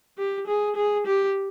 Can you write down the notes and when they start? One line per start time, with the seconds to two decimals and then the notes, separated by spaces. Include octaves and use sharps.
0.18 G4
0.47 G#4
0.76 G#4
1.06 G4